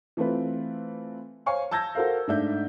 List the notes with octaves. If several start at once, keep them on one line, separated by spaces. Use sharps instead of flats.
E3 A3 C4 F4 B4
C5 C#5 F5 G#5 C#6
A5 E6 G6 G#6 A#6
F#4 A4 A#4 C5 F5
G#2 A3 D4 D5 E5 G6